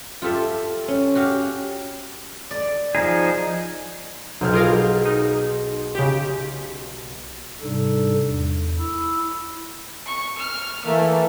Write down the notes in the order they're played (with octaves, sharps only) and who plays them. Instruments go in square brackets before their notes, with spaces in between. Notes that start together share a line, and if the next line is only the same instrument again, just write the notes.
[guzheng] F4 G4 A4 E5
C#4
F#4 G4 F5
D5
[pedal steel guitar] F3 D#4 G#4
[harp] B1 C5 F6
[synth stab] F4 A#4 F5 [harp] G#4
[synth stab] D#4
C#3 G4
[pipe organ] G#2 C3 G3 D4 D#4 A4
E2
E4 B5 E6
[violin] C#6
F6
[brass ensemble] E3 A#3 [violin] A3